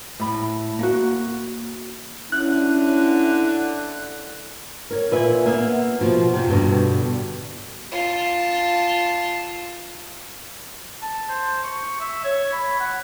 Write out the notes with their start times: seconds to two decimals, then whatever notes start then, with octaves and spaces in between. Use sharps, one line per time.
0.20 A2 B5
0.79 A#3 F#4
2.32 D3 C#4 E4 F#6
4.91 A#4 C#5
5.11 A#2 B4 E5 G#5
5.46 A#3 B3 E5
6.01 B2 F3
6.33 F2 C3
6.50 G2 B2 D3 G3
7.92 F4 A5
11.02 A5
11.29 C5
11.63 C#6
12.00 E5
12.24 C#5
12.53 B5
12.80 F#5